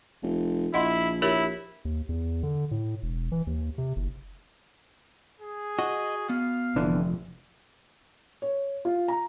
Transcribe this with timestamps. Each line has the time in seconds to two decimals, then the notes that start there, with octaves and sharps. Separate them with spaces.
0.23 F1
0.74 A#1 E4 D#5 F#5 C6
1.22 E4 G4 A#4 C#5
1.85 D#2
2.09 E2
2.43 D3
2.71 A2
3.03 E1
3.32 E3
3.47 D#2
3.78 C3
3.96 F#1
5.41 G#4
5.79 F#4 D#5
6.30 B3 F5
6.76 F1 D3 E3
8.42 C#5
8.85 F4
9.08 A#5